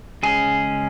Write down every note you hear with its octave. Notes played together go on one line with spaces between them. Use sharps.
C#3 G#3 C#4 G#4